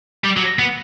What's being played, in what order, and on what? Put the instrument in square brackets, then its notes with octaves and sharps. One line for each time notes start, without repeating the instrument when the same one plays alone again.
[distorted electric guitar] G3
F#3
B3